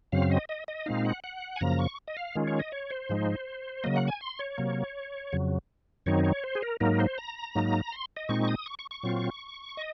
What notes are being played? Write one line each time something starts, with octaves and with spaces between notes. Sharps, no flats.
F#2 C#3 F#3 C4 F5
D#5
D#5
D#5
A#2 G#3 C4 D#4 F5
F#5
F#5
G#5
F#2 C#3 F3 A#3 A#5
C#6
D#5
F5
D#3 G#3 C#4 F4
C#5
D#5
C#5
C5
G#2 F3 G#3 D#4
C#3 F#3 A#3 D#5
F#5
G#5
C6
C#5
C3 F#3 A#3
F2 C#3 F#3
F#2 D#3 F#3 C4 D#4 C#5
C#5
C5
G#4
A#4
G#2 F#3 A#3 D#4 A#4
C5
A#5
G#2 F#3 A#3 D#4
C6
D#5
A#2 G#3 C4 D#4 C#6
D#6
C#6
C#6
C#6
A#2 F#3 C4 F4
D#5